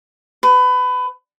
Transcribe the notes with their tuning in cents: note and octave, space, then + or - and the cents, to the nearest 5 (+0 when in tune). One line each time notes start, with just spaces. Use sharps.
B4 +25